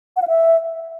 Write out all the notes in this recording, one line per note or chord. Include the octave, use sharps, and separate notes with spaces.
F#5
F5
E5